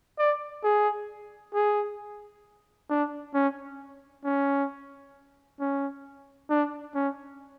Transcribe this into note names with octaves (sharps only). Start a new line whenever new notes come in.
D5
G#4
G#4
D4
C#4
C#4
C#4
D4
C#4